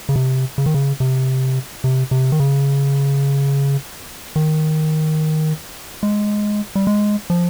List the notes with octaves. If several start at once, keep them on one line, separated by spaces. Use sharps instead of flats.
C#3
C3
C#3
D#3
C#3
C3
C3
C3
D#3
C#3
D#3
G#3
G3
G#3
F3